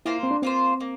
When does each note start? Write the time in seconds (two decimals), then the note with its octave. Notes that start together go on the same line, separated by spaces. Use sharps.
0.06 A#3 E4 F4 C5
0.23 C4
0.31 D4
0.42 A#3 C4 F4 C5
0.80 A#3